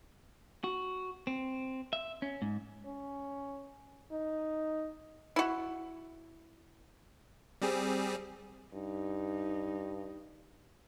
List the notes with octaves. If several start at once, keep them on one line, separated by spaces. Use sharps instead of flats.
F#4
C4
E5
C#4
G#2
C#4
D#4
E4 F#4
G3 C4 G#4
G2 D#4